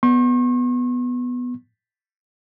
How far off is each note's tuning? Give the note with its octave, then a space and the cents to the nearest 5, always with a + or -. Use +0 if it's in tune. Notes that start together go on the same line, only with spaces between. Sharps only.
B3 +0 C#6 -45